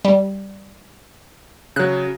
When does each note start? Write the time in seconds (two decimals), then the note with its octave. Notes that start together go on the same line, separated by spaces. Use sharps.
0.05 G3
1.76 C#3 F#3 F#6